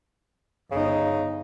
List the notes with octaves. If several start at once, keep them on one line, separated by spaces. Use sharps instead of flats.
G1 C#3 D#4